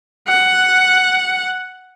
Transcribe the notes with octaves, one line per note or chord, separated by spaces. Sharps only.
F#5